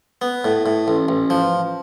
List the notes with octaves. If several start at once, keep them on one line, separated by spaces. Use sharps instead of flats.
B3
A2
A2
A1
A1
F3